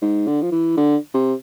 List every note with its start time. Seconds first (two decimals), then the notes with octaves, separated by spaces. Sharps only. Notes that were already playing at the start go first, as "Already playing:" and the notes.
0.01 G#2
0.27 D3
0.42 F3
0.52 E3
0.77 D3
1.14 C3